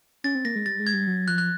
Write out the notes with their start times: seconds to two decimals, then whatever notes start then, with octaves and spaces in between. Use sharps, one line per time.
0.24 C#4 A6
0.35 C4
0.45 A#3 A#6
0.56 G#3
0.66 G3 A6
0.80 G#3
0.87 G#6
0.94 G3
1.07 F#3
1.28 F3 F#6
1.38 F#6